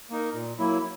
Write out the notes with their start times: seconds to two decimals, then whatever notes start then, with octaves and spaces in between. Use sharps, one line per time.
0.10 A#3 D#4 A#4
0.34 A#2
0.59 F#3 A#3 E4